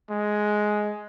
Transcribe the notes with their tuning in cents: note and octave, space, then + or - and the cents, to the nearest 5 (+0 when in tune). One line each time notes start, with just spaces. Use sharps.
G#3 +10